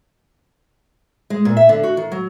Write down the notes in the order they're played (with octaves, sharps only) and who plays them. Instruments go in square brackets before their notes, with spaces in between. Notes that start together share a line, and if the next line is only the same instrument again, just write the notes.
[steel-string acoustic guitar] G#3
A#2
E5
D3
F#4
D#3
F#3